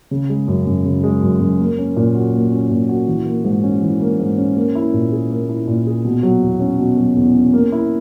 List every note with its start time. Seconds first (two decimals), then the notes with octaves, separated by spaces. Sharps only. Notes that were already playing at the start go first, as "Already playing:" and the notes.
0.11 C#3
0.29 G#3
0.48 F#2
0.66 F#2
0.85 C#3
1.04 G#3
1.22 F#2
1.40 F#2
1.59 A#3
1.78 C#4
1.96 A#2
2.15 F#4
2.34 A#3
2.52 C#4
2.71 A#2
2.89 F#4
3.08 E3
3.26 A#3
3.44 G#2
3.63 C#4
3.82 E3
4.01 A#3
4.19 G#2
4.38 C#4
4.56 A#3
4.75 E4
4.93 A#2
5.12 G#4
5.30 A#3
5.49 E4
5.67 A#2
5.86 G#4
6.05 B2
6.23 F#3
6.42 E2
6.60 C#4
6.79 B2
6.97 F#3
7.17 E2
7.35 C#4
7.53 A#3
7.72 E4